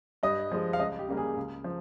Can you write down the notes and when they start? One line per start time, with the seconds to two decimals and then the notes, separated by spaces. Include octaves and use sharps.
0.23 G2 D#5
0.52 F3 G#3
0.73 F5
0.79 C#2 D#5
0.99 G4
1.08 C#3 G3 A#3
1.17 G#4
1.37 C#2
1.64 F3